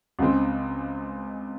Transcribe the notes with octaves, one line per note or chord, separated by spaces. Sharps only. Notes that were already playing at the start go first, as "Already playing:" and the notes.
C#2 C#3 G#3 C4